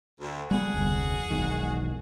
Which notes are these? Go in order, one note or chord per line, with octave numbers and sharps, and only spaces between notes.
D2
G3 B3 F#4 G#4
F1 D2
E1 B1 D#3